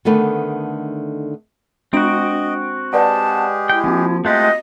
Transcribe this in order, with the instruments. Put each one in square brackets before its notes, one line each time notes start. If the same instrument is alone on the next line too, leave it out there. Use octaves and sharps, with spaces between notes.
[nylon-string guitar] D3 D#3 A3 B3
[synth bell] G#3 D4 D7 [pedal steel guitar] C4 F#4 [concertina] D#5
[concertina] G#3 G4 G#4 [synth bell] B4 D5 F#5 [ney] A5
[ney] E4 [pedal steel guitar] G5
[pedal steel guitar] F3 [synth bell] A#3 C4 F#4
[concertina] G#3 C5 F#5 [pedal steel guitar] A3 F4 G4 [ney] D#5